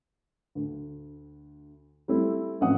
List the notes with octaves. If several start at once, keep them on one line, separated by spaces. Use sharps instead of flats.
D2
G3 A3 C4 E4
A1 F3 C4 F#5 D#6